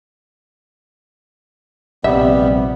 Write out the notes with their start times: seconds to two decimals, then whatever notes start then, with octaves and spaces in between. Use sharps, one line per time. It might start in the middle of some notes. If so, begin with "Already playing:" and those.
2.04 A#1 C3 G3 B3 E5